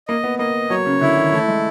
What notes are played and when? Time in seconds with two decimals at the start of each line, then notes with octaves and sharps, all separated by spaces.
0.08 A#3 D#5
0.24 B3
0.39 A#3 D#5
0.70 F#3 C#5
0.86 C#3
1.01 D3 E4
1.17 D#3
1.32 E3 A3
1.48 G#3